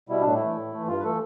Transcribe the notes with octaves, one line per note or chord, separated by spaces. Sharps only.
B2 G3 E4
A2 D4
E4
E3 A3
A2
E3 A3
G2 F4
B4
E3 A3 A4